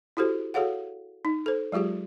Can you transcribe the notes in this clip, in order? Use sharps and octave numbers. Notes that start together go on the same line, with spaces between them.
E4 F#4 G4 A4 C5
F#4 G#4 A4 C#5 F5 F#5
D#4
A4 C5
F#3 G#3 F4 G4 G#4